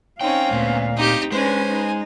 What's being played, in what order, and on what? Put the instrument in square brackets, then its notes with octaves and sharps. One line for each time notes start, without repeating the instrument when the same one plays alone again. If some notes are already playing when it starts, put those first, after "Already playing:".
[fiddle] C4 C#4 [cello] D#4 C#5 [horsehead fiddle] F5 [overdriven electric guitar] G5
[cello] D2 B3 [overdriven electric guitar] A#2
[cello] C4 [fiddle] D#4 G4
[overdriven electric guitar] G#3 [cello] C#4 D4 [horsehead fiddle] B4 [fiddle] C5 G#5
[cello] D#4